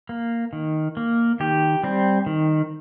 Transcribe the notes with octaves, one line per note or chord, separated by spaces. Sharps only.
A#3
D#3
A#3
D#3 G4
G3 C4
D#3